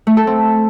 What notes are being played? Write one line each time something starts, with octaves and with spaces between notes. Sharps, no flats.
A3
A4
C4